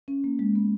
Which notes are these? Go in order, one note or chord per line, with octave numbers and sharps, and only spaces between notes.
C#4
A#3
G#3
B3